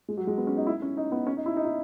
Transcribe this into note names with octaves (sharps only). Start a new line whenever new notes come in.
G#3
F#3
G#3
B3
C#4
D#4
E4
C#4
D#4
B3
C#4
D#4
E4
D#4
E4